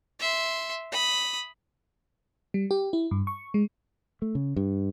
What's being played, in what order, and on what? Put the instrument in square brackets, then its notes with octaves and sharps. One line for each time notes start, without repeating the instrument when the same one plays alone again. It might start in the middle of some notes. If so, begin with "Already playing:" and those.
[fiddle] E5 C6
B5 D#6
[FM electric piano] G3
G4
E4
G2
C#6
G#3
[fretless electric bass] A3
C#3
G2